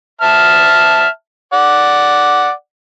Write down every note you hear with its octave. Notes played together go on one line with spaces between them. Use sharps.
E5 A5 F6
D5 F#5